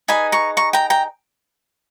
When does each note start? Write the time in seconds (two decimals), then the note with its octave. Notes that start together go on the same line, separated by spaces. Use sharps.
0.08 D#4 G#4 B4 G#5 B5
0.32 A#5 C#6
0.57 A#5 C#6
0.73 G5 A#5
0.90 G5 A#5